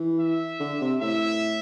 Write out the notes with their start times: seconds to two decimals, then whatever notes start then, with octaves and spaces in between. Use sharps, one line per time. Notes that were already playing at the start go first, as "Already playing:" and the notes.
Already playing: E3
0.20 E5
0.60 D3
0.81 C3
1.01 A2 E5